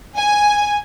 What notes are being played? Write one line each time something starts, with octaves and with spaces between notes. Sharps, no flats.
G#5